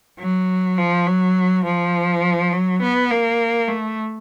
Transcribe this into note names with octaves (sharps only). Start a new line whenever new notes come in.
F#3
F3
F#3
F3
F#3
B3
A#3
A3